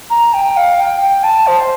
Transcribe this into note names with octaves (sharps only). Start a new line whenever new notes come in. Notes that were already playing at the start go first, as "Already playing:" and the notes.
A#5
G5
F5
G5
G5
A5
C5